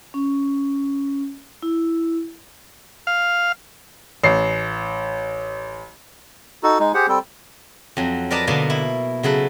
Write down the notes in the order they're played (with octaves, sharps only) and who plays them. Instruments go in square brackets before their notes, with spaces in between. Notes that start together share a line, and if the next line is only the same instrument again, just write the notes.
[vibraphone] C#4
E4
[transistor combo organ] F5
[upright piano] A1 C7
[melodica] D#4 F#4 A4
G#3 D#4
G4 G#4 C5 F#5
G3 C4 A4
[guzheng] F2 F#3
A#4 B4 D5 D#5 A5 A#5
B2 D3 A#3 D#4 D#5 A5
E4
C#3 F#3 A4 B4